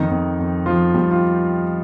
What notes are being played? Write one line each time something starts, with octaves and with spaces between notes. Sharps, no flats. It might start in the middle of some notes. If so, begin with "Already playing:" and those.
Already playing: F2 D#3 D#4
F2
F2
F3 F4
F2 G3 G4
F4